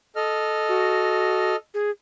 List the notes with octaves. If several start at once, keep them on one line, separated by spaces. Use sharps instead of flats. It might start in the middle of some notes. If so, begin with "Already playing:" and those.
A4 D#5 F6
F#4
G#4